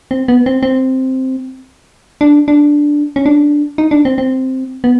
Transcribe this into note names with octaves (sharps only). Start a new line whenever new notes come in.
C4
B3
C4
C4
D4
D4
C#4
D4
D#4
D4
C4
C4
B3